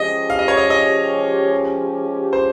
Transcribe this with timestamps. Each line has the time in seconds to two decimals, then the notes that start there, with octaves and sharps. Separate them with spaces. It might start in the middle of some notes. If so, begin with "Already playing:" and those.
Already playing: F3 G#3 C#4 G4 D#5
0.30 F5
0.39 D#5
0.48 C#5
0.57 D#5
0.70 D#5
2.33 C5